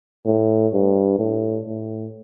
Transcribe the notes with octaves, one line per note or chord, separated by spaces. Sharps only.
A2
G2
A2
A2